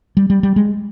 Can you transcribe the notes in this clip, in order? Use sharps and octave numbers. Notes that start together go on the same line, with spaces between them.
G3
G3
G3
G#3